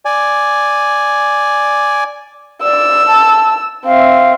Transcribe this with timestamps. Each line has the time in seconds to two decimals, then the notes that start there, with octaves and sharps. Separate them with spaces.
0.05 D5 G#5
2.62 D5 E6
3.07 A5
3.86 C4 E5 F5